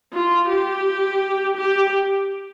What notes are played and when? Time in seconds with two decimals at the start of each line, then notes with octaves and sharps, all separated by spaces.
0.13 F4
0.49 G4
1.57 G4